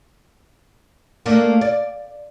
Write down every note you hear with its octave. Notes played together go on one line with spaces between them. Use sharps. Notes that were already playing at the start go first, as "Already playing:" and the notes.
A3 A#3 D4
D5